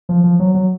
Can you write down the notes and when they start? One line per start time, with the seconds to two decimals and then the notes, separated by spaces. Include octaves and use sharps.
0.09 F3
0.24 F3
0.40 F#3
0.54 F#3